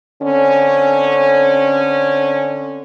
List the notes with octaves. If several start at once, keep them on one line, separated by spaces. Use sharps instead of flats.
D3 C4 C#4